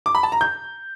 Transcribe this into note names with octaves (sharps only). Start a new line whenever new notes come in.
D6
B5
A5
A#5
G6